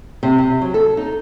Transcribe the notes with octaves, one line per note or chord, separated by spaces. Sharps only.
C3
C3
F#3
A4
D#4